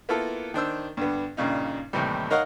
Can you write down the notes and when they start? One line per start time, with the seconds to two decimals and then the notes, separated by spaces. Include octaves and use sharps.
0.09 A#3 B3 E4 F4 A4
0.54 D#3 D4 C5 E6
0.97 G2 D3 B3
1.37 G2 A#2 C#3 D#4
1.93 D#2 A2 C3 E3 G3
2.30 D#4 A#4 C#5 D#5 F5 F#5